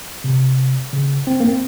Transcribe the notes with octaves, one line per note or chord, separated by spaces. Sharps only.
C3
C#3
C4
A#3
C4